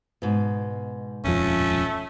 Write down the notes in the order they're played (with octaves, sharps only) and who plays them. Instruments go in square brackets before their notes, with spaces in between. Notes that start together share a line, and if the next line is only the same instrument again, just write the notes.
[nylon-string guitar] G#2 B2
[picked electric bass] D#1 F2 F3 [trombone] A3 [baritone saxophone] C#4